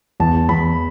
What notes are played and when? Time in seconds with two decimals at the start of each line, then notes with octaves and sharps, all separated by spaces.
0.20 E2 A5
0.49 E2 B5